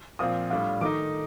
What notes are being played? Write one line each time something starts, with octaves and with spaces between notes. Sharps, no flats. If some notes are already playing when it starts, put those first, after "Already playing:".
A#2 F3 C4 F4 D#6
A2 G3 D4 F4
D#3 A3 D#4 D6